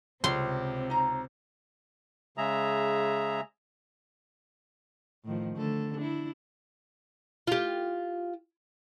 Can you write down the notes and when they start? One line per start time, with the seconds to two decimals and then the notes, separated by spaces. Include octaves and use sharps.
0.24 C#2 C3 C4 C6
0.90 D#4 A#5
2.37 C#3 G#3 G#4 E5 A#5
5.24 A2 D#3 F3
5.56 D3 A3 A4
5.98 D4 E4
7.47 F4 G4